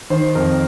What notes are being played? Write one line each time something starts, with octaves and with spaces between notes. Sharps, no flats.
D#3 C5
F2 A#4